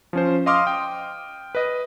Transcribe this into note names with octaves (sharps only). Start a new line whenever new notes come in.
F3 C#4 C5
D#5 F5 C6 D6 D#6 F6
G5
B4 D#5